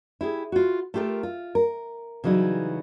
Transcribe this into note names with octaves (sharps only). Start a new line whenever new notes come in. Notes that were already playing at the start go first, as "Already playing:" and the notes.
E4 G4 G#4
F4 F#4
A3 F4 G4 A4 A#4
F4
A#4
C#3 E3 F#3 G3 D#4